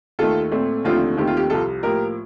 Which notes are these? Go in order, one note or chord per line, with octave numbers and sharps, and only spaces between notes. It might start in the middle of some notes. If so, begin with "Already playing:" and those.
D#2 D#3 A3 F4 A4
A#2 A3 C4
D#2 D3 F3 A3 C4 F4
D#2 D#3 A3 C4 G4
F4
G4
C2 C3 F3 F4 A4
A2 F3 A#3 G4 A#4